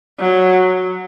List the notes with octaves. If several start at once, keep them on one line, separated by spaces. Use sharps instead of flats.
F#3